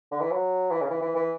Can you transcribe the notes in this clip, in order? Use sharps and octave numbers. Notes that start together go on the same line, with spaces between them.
D3
E3
F#3
E3
C#3
E3
E3
E3